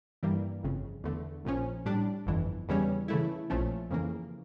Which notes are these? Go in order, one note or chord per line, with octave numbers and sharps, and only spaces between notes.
G2 E3 G3 A#3
G1 F2 C#3
E2 D3 A3
A#1 A#2 F3 C#4
A2 G3 D4
G1 F2 E3
E2 C#3 E3 G3 C#4
C#3 E3 A3 E4
A#1 A#2 F3 A3 C#4
F2 C#3 E3 A#3